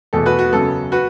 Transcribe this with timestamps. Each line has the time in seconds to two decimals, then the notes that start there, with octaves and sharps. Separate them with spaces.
0.13 E1 E2 B2 A3 A4
0.26 F#4 B4
0.39 F#4
0.52 F#2 C#3 F#3 B3 A4
0.92 F#4 B4